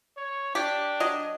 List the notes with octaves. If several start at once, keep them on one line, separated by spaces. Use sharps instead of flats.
C#5
D4 G4
F#3 D#5